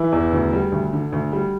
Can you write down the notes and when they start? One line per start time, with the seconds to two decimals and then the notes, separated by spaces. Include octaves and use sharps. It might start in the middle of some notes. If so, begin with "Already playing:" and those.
Already playing: E3 E4
0.12 E2
0.33 D2
0.53 G3
0.72 D2
0.93 D3
1.12 D2
1.32 G3